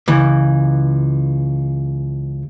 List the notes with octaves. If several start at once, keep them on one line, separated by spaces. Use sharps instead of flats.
C#2 E3